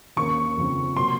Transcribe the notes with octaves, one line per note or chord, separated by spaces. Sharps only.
D#2 D#3 A#3 C#4 C#6
F2 C#3 F3 C4
C3 F#3 A#3 C6